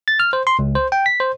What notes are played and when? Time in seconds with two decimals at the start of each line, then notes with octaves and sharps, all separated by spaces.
0.08 A6
0.20 F6
0.33 C5
0.47 C6
0.59 C#2
0.75 C5
0.92 G5
1.06 B6
1.20 C5